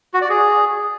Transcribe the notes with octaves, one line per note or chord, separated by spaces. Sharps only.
F#4
D5
G#4